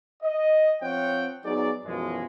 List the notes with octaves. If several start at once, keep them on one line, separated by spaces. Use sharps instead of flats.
D#5
F3 C4 C5 C#5 F#5 G5
F#3 B3 D#4 G#4 D5
F#2 B2 E3 F3 G#3